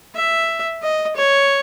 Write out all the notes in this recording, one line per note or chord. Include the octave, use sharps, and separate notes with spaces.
E5
D#5
C#5